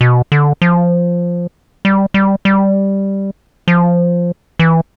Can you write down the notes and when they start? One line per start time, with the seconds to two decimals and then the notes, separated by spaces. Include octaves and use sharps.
0.01 B2
0.32 D3
0.62 F3
1.85 G3
2.14 G3
2.45 G3
3.68 F3
4.59 E3